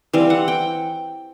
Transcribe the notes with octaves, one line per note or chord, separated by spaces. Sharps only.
E3 G3 C4 F5
F#5
G5